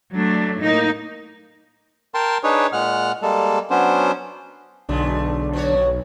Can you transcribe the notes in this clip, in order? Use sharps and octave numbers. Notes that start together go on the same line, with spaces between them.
F#3 A3 D4
A2 A#3 D#4
A#4 G5 A5 C6
D4 D#4 G#4 B4 C#5
A#2 G#3 F#5 F6
G3 G#3 A#3 A4
F#3 B3 C#4 D4 C5
B1 D3 G#3 A3 D4
B2 F#4 C#5